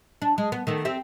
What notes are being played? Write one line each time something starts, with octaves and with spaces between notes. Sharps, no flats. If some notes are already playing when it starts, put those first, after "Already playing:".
D4
G#3
B3
D#3 A3 B3
C4 G4 E5